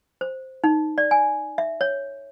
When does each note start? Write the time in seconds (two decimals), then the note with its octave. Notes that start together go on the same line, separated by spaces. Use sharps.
0.21 C5
0.64 D#4
0.98 D5
1.11 G#5
1.58 E5
1.81 C#5